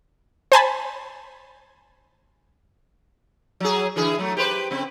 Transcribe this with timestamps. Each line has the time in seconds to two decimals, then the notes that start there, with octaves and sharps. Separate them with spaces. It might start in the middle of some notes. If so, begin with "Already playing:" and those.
0.52 C5 G#5 A5 B5
3.60 F#3 G#4
3.96 D3 E3 G#4
4.19 F#3 A3
4.37 G4 B4 C5
4.71 C#3 C4